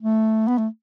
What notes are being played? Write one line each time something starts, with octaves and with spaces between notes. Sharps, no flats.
A3
B3
A3